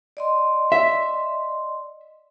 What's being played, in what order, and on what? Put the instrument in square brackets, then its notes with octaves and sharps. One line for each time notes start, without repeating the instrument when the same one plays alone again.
[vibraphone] D5 D#5 C6
[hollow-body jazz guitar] E5